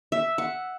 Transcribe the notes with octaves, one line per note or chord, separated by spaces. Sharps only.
E5
F#5